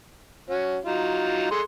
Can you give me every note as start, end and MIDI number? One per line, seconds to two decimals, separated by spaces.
0.49 0.78 61
0.49 0.78 66
0.85 1.51 54
0.85 1.51 63
0.85 1.51 65
1.51 1.61 68
1.51 1.61 69
1.51 1.61 84